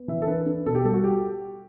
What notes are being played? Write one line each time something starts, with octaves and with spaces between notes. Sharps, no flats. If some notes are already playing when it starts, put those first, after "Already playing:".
Already playing: B3
E3 E5
A4
D4 B4
D4
B2 A4
G4
G3 A4
F#4
G4